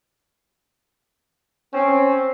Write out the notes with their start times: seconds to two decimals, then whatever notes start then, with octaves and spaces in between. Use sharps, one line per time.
1.74 C4 C#4